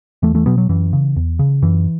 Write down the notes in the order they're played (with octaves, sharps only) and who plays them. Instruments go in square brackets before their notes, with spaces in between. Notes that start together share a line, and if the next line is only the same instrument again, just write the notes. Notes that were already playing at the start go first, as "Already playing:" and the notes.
[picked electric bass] E2 E3 A3
E3 A3
B2 F#3 B3
F#3
F#2 E3
C#3
E2
C#3
F#2 E3